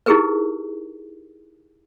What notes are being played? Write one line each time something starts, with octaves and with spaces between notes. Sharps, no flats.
D#4 E4 G4 G#4 A#4 B4